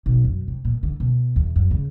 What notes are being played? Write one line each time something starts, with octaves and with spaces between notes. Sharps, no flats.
B1
F#2
C3
A#2
D3
B2
E2
F#2
C#3